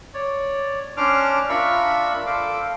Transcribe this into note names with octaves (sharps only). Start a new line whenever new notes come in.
C#5 D5
C#4 D4 C5 D6 F6
D4 F4 A#4 E5 B5 C#6
A4 C5 F5 D6
F5